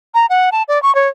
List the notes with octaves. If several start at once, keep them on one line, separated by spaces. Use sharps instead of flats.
A#5
F#5
A5
D5
C#6
C#5